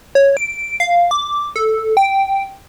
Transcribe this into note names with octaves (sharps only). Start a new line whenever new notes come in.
C#5
D7
F5
D6
A4
G5